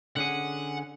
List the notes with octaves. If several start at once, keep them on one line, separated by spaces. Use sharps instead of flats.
D3 C#4 G#4 F#5